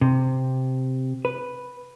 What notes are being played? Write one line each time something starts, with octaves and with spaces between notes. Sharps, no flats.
C3
B4